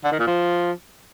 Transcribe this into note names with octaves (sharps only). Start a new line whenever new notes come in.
D3
D#3
A#2
F3